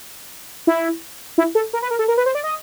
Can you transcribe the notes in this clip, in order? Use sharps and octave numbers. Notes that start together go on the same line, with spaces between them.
E4
E4
A4
A#4
B4
A#4
A4
A#4
B4
C5
D5
D#5